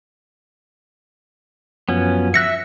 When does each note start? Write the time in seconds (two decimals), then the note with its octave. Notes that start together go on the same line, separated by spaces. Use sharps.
1.89 F#2 F3 B3 C#4
2.34 E5 F#6 A#6 C#7